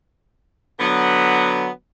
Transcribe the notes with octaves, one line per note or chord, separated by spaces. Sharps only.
D3 F#3 B3